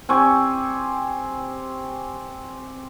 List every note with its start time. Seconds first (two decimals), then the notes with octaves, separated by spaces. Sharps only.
0.09 C4 G4 G#5 C#6